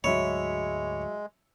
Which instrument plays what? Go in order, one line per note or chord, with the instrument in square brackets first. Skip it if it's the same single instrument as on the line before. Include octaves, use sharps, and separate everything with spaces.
[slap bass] D2 G#2 [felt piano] F#3 E5 B5 [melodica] G#3 [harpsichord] C#5